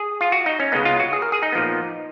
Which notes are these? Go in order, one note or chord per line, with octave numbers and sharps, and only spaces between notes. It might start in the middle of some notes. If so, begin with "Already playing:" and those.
Already playing: G#4
F4
F#4
D#4
C#4
C#2 C#3 G#3 B3 D#4
F4
F#4
G#4
A#4
G#4
D#4
A#2 F3 B3